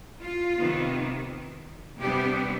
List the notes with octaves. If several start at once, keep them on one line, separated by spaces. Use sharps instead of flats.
F4
C3 D#3 B3
C3 G3 B3 D4 G4